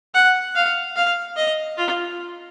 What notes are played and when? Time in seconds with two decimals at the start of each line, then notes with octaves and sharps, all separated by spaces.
0.14 F#5
0.56 F5
0.96 F5
1.37 D#5
1.77 F4